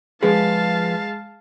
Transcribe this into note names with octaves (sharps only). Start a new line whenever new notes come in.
F3 G#3 G#4 B4 F5 A5